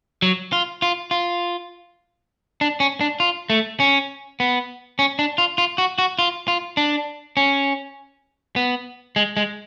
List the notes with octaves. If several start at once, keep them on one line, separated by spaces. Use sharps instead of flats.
F#3
F4
F4
F4
D4
C#4
D4
F4
A3
C#4
B3
C#4
D4
F4
F4
F#4
F#4
F4
F4
D4
C#4
B3
G#3
G#3